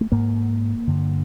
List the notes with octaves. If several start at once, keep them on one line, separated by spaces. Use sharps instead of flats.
A3
G#2 A#3
G2 D3